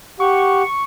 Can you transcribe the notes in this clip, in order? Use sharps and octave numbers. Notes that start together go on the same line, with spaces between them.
G4 F#5 C#6